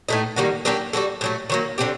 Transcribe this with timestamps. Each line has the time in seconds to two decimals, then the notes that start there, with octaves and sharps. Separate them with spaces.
0.09 A2 A3 D#4
0.36 D#3 G3 A#3 F#4
0.65 F#3 A#3 D4 G4
0.93 G3 A#3 F#4 A4
1.21 A2 F#3 A3
1.50 D#3 F#3 A#3
1.78 D3 F#3 C4 G4